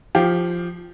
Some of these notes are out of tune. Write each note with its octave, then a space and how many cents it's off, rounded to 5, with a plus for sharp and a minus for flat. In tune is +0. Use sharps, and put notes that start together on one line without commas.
F3 +0 G4 +0 F5 +0